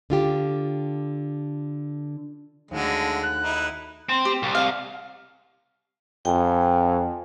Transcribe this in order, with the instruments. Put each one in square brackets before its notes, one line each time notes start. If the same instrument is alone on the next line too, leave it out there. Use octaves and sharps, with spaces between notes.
[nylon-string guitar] D3 F4 G4
[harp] D#2 A3 F#4 [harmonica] D3 G#3
[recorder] F#6
[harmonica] D#4 E4
[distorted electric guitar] C4
[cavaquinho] G4
[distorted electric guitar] C2
[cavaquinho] F5
[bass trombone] F2 [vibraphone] G5 G#5